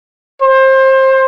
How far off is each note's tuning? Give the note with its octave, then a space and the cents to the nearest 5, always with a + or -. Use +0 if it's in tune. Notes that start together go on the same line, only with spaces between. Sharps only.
C5 +25